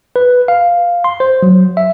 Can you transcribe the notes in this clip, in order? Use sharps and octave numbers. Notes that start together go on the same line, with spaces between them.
B4
F5
C6
C5
F#3
E5